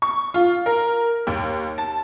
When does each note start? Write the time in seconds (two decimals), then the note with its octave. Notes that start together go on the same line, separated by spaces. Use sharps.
0.02 C#6
0.34 F4
0.66 A#4
1.27 D#2
1.78 A5